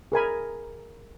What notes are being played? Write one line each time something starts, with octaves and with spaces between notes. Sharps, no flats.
G#4 A#4 G#5 B5